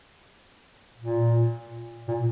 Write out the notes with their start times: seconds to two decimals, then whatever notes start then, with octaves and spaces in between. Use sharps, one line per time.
0.98 A#2
2.08 A#2